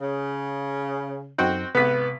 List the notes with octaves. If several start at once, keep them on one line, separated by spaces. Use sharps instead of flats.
C#3
F#2 C4 D#4 F#4 G5
G#1 C3 B3 B4 B6